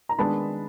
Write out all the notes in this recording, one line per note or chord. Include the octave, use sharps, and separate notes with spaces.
A#5
D#3 G#3 B3 D4 A5 B5